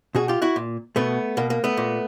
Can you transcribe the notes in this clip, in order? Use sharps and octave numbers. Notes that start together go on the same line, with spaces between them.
B2 F#4 G#4
F4 G4
E4 F#4
A#2
B2 A3 B3
B2 A#3
A#3
A3 B3
A#2